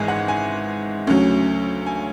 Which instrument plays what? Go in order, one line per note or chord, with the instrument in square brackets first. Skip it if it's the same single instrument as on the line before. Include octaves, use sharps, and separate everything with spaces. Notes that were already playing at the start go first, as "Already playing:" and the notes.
Already playing: [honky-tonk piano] G#1 G#2 E3 G#3 G#5
F#5
G#5
D2 C#3 F#3
G#5